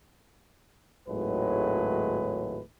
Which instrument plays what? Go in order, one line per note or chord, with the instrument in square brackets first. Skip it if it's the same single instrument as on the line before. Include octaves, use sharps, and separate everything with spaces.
[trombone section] G#1 D#2 A2 F#3 G#3 B4